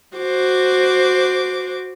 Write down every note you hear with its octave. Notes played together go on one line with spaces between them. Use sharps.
F#4 C5 D6